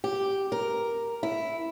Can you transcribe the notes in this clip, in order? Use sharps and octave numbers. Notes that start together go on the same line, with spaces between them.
G4
A#4
E4